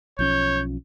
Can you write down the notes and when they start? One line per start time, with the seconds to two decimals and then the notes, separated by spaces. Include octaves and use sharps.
0.19 B1 F3 C#4 C#5 G6